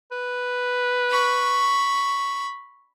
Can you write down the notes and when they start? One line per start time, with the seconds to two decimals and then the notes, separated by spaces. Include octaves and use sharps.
0.12 B4
1.11 B5 C#6